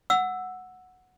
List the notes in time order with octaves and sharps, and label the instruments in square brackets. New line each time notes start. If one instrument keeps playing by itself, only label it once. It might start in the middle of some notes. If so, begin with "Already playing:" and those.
[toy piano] F#5 E6